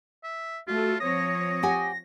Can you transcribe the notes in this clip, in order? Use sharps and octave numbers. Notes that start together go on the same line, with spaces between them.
E5
A3 F4 F#4 A4
F3 C4 C#5 D#6 A#6
G4 F#5 G#5